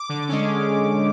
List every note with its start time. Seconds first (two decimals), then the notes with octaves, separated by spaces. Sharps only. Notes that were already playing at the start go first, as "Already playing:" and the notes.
Already playing: D6
0.09 D3
0.29 G#3 C#4